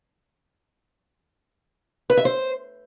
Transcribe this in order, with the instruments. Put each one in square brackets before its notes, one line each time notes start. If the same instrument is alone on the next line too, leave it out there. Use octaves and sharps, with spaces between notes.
[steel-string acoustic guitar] B4
E5
C5